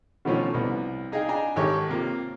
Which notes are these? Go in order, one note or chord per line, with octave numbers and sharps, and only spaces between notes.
B2 D3 D#3 F3 A3 C#4
C2 B3
D#4 G#4 D#5 F5 G5
D4 G5 G#5 A#5
G#1 D#3 G4 A4 C#5 C#6
C3 A#3 F4